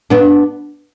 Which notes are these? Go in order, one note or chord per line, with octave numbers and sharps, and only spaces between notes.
B3 D4